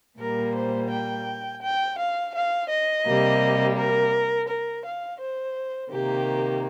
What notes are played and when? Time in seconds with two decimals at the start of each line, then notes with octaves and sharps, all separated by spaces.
0.19 A#2 G3 A#3 A#4
0.54 C5
0.90 G5
1.61 G5
1.97 F5
2.33 F5
2.69 D#5
3.05 C3 G3 A#3
3.76 A#4
4.48 A#4
4.84 F5
5.19 C5
5.90 C3 D#3 A#3 G4